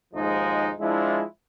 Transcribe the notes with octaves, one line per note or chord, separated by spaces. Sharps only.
D#2 G#2 F3 G#3 D#4
F3 G#3 D4 E4